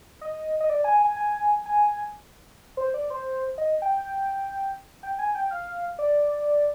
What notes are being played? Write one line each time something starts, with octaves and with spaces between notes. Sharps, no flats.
D#5
D#5
D5
G#5
G#5
G#5
G#5
C5
D5
C5
D#5
G5
G5
G#5
G5
F5
D5